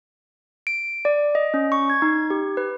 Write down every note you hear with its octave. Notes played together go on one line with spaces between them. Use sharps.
D7
D5
D#5
C#4
C#6
G#6
D#4
G4
B4